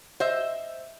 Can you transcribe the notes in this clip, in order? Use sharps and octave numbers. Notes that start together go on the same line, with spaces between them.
C5 D#5 E5